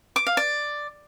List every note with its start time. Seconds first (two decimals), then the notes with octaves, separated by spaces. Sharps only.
0.16 D6
0.27 F5
0.37 D5